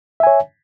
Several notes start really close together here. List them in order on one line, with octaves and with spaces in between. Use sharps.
E5 G#5 C#5